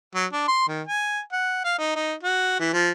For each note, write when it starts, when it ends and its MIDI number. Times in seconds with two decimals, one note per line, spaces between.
0.15 0.26 54
0.32 0.45 62
0.48 0.63 84
0.68 0.82 51
0.87 1.20 80
1.32 1.63 78
1.64 1.78 77
1.78 1.95 63
1.96 2.13 63
2.23 2.59 66
2.60 2.70 52
2.73 2.91 53